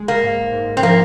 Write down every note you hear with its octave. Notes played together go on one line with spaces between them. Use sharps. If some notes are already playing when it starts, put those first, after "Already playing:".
Already playing: G#3
A#3
G#2
G#2
C4
F3 A#3